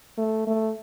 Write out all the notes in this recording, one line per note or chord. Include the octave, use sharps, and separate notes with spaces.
A3
A3